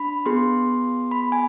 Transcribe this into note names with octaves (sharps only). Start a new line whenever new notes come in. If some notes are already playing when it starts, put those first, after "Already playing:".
Already playing: D4 B5
B3 F4 G#4 C6
B5
G#5